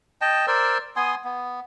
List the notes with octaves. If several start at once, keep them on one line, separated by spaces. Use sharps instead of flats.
D#5 G5 A5
A#4 C5 D5 E6
B3 G#5 C6 D#6
B3